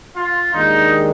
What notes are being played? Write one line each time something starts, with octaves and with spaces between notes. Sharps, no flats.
F4
D#2 D#3 G#3 D4 D#4